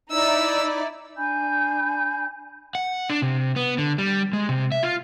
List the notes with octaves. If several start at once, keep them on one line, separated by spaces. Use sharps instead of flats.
D#4 E4 D5 E6
D4 G#5 B5 G6
F#5
D4
C3
B3
D3
G3
G#3
C3
E5
F4